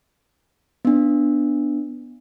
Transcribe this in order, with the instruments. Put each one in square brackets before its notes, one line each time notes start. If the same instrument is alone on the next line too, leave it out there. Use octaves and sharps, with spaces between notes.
[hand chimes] B3 D4